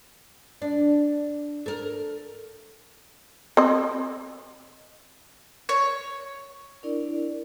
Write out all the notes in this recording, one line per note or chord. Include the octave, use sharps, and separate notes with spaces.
D4
A4 A#4
C4 D#5
C#5
D4 E4 A#4 D5